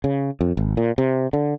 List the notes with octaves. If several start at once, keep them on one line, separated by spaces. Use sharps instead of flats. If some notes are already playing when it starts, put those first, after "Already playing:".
C#3
F2
G#1
A#2
C3
D3